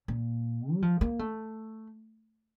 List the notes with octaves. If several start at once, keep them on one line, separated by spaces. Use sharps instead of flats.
A#2
G3
F3
A#3
A3